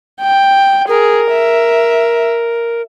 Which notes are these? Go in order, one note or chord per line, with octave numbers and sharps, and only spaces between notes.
G5
G#4 A#4
E5